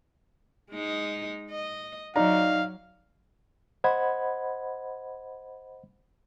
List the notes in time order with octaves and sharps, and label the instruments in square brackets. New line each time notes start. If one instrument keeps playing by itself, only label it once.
[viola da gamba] G#3 D#4
D#5
[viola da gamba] F#3 [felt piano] D#4 D5 A#5 [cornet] F5
[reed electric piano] C5 D#5 F#5 B5 G#6